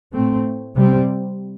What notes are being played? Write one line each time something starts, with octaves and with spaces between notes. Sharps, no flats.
A2 A3 C4
C3 G3 C4